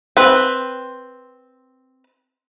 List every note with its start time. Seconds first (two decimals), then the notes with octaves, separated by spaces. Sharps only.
0.17 C4 B4